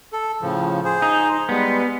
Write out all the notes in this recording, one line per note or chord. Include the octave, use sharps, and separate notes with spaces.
A4
A2 C#3 F3
G#4 C5
D#4
G3 G#3 B3